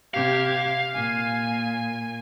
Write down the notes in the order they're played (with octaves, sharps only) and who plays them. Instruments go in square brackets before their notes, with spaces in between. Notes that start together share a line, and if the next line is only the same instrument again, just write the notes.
[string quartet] C3 G4 G#6 [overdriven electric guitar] F5
[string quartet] A#2 G#5